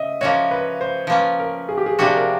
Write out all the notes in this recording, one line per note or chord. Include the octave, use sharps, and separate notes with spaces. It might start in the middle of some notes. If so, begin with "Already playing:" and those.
Already playing: C#3 D#5 E5
F3 A#3 C#4 F#4 C#5
B4
C5
F3 A#3 C#4 B4
A#4
G#4
G4
G#4
C3 F3 A#3 D4 F#4 G4
A#4